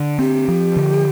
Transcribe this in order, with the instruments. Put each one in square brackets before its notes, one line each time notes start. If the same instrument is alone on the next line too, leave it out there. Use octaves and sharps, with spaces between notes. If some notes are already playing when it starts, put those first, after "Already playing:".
Already playing: [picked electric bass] D3
[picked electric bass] C4 [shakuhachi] G4
[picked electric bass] F3
D3